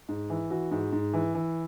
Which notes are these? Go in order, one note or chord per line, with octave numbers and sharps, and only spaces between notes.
G#2
E3
E3 F#4
G#2
G#2
E3
E3